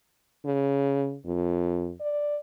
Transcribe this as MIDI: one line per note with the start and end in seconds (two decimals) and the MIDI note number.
0.45 1.17 49
1.26 1.92 41
2.01 2.38 74